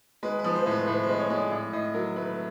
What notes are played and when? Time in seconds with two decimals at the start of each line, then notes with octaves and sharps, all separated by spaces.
0.23 G#3 B4
0.39 B4
0.44 F3
0.55 C5
0.66 A2
0.71 B4
0.87 A2 C5
1.03 C5
1.09 G#3
1.19 C#5
1.30 G#3 D5
1.51 A2
1.73 A2 D#5
1.94 F#3 A#4
2.16 A3 B4